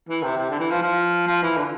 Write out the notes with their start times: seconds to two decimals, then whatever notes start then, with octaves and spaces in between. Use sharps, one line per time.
0.09 E3
0.23 C3
0.38 C3
0.50 D3
0.60 E3
0.71 F3
0.82 F3
1.27 F3
1.43 E3
1.57 D3